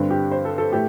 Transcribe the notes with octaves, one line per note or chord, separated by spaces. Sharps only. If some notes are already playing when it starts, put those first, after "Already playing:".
Already playing: G2 D3 G3 C4
G4
C5
A4
A4
A2 A3 G4